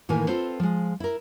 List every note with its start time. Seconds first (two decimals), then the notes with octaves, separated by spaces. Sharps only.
0.09 A2 D#3 E3 A#3 A#4 G#5
0.28 C4 F4 A4 B4 C5
0.60 F3 G#3
1.00 E4 A#4